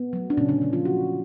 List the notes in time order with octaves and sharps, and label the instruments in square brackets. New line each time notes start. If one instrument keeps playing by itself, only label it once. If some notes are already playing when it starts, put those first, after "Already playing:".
Already playing: [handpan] B3
F#3 A3
D4
A#2 C#3 C#4
D3 D4
F#3 A3
F3 F4
C3 F#3 F#4